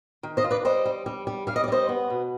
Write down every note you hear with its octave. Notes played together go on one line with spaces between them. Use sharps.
D#3
C5 D#5
F4
B4 D5
G3 C5 D#5
G3
G3
G3
G3 F5
D#5
D5
G3 C5 D#5
B3
B2